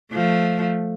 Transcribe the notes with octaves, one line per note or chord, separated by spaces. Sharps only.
F3 A3